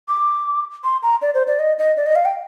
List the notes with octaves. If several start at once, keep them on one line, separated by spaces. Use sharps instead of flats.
D6
C6
A#5
D5
C5
D5
D#5
D#5
D5
D#5
F5
G5